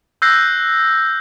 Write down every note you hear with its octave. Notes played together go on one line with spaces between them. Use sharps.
E6 F#6 G6 A#6 C7